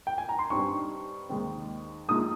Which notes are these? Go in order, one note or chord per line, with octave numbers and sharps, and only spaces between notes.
G5
G#5
A#5
C6
G2 G3 C4 D#4 C#6
D#2 D#3 G#3 C4
A#1 A#2 G#3 D#4 D#6